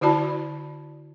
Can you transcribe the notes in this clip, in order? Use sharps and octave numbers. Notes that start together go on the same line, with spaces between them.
D3 E4 F#4 D5 A5 B5